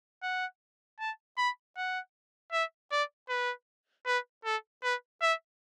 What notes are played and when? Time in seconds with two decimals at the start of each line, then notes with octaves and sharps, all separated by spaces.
0.23 F#5
0.99 A5
1.38 B5
1.77 F#5
2.52 E5
2.92 D5
3.29 B4
4.06 B4
4.45 A4
4.83 B4
5.22 E5